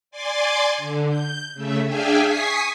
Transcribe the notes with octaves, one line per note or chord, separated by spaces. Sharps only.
D5 G#5 C6 D6
D3
G6
C#3 A3 E5
D4 G#4 E5 F5 G5 G#5
G#5 C#6 D#6 B6 C7